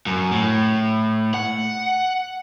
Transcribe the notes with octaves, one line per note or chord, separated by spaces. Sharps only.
F#2
A2
F#5